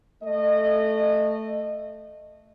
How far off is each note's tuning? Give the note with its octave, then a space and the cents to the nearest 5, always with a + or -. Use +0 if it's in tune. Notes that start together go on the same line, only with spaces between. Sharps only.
A3 +0 D#5 -25